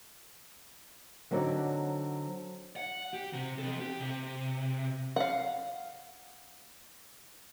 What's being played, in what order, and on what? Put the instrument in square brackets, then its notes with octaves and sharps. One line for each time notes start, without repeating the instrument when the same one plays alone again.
[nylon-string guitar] D3 F#3 C4 D#4 D5
[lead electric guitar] F#5
G4
C3
C4 A4
G4
C3
[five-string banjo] F5 F#5